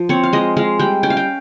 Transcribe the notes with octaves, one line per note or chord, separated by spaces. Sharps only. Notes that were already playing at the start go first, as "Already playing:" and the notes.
Already playing: F3
C4 C#5
F5
G#3 D#5
G#3 F5
G3 G5
C#4 G5
F5
G5